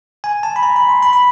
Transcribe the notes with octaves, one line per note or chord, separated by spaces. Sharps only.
G#5
A5
B5
A#5
B5
C6
B5
B5